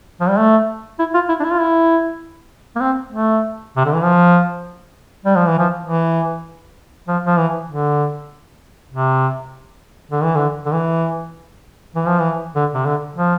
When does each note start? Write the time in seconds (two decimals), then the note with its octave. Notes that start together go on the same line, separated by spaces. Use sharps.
0.20 F3
0.29 G3
0.38 A3
0.99 E4
1.14 F4
1.29 E4
1.40 D4
1.44 E4
1.52 F4
1.60 E4
2.76 A#3
2.81 C4
3.12 A3
3.77 C3
3.85 D3
3.94 E3
4.03 F3
5.25 G3
5.36 F3
5.48 E3
5.59 F3
5.86 E3
7.08 F3
7.26 F3
7.38 E3
7.69 D3
8.90 C3
10.11 D3
10.23 E3
10.35 D3
10.66 D3
10.73 E3
11.95 E3
12.07 F3
12.20 E3
12.55 D3
12.74 C3
12.85 D3
13.16 F3